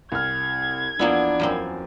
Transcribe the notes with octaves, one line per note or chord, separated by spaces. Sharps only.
C2 F6 G#6
E2 F3 A#3 B3 D4 E4
F#2 A#3 C4